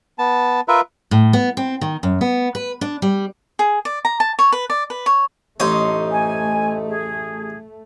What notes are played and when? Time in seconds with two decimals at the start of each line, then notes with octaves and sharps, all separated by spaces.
0.19 B3 A5
0.68 F4 A#4 B4 E5
1.11 A2
1.33 B3
1.57 C4
1.81 D#3
2.03 F#2
2.21 B3
2.55 B4
2.81 D4
3.02 G3
3.59 G#4
3.85 D5
4.05 A#5
4.20 A5
4.39 C#5
4.52 B4
4.70 D5
4.90 B4
5.06 C#5
5.60 A1 A3 D#4 C5 C#5
6.11 G#5
6.88 G#4